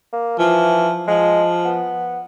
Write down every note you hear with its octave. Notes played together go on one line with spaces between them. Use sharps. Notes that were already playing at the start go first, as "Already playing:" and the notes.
A#3
E3 F3
F3 G#3
B3